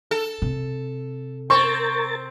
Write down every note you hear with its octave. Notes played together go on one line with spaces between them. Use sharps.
A4
C3
C4 A#4 C#6 A6